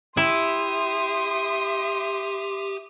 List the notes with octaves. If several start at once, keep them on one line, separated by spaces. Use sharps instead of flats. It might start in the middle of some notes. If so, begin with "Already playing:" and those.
E4 G4 E5 C6 D#6